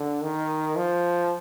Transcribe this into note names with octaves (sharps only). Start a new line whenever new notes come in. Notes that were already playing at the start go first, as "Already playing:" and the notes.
Already playing: D3
D#3
F3